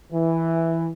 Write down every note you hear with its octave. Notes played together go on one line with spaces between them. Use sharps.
E3